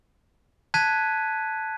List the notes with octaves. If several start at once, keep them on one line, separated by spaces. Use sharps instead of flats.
A5 F#6 G#6 B6 D#7